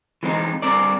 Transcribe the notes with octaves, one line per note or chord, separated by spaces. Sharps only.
E3 G#3 C4 D#4
G2 C4 A#4 D5